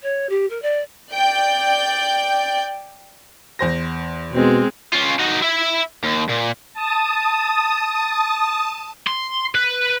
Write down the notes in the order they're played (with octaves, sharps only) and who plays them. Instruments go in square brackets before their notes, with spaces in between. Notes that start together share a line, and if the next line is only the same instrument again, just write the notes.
[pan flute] C#5
G4
A#4
D5
[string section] D5 G5 G6
[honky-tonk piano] E2 C5 A#6
[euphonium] B2 [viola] G#3 C4
[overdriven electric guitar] C#4 F4
D#4 F#4
E4 E5
D#2
A#2
[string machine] A5 D#6
[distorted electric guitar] C6
B4